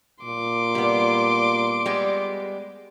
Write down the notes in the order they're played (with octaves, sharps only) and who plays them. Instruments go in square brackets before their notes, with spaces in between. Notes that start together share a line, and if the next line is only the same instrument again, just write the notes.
[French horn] A#2 [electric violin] C6 D6
[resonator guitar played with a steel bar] G3 B3
G3 G#3 B3